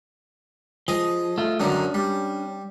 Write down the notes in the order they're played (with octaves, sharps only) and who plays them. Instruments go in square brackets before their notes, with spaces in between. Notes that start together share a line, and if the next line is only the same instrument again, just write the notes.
[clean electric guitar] F3 [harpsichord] G#4 D#5
[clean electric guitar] A3 F4
[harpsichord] F#2 D3 D#3 [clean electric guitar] C#4 D4
[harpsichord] G3